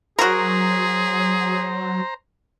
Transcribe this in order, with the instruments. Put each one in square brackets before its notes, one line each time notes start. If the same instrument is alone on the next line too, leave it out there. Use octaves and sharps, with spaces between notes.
[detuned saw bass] F#3 [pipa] F#4 A#4 [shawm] G#4 [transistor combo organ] C5 A#5